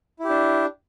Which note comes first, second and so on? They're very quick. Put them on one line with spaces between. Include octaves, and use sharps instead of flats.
E4 G4 D4